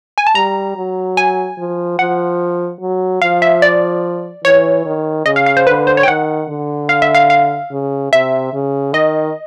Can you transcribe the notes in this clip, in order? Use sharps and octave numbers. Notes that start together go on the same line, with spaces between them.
G#5
A5
G3 A#5
F#3
G#5
F3
F3 F#5
F#3
F3 F5
E5
D5
E3 C#5
D#3
C#3 D#5
F5
F5
C5
D3 B4
C5
C#5
G5
D#3 F#5
D3
F5
E5
F5
F5
C#3
C3 E5
C#3
D#3 D#5